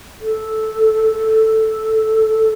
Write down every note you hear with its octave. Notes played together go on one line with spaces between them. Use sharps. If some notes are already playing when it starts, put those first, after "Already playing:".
A4
A4